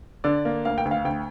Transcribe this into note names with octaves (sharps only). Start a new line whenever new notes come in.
D3 D5
A#3
D2 F5
G5
D2
F5
D2 G5